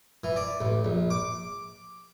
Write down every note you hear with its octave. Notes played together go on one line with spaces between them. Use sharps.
E3
D5
A1
A#1
D6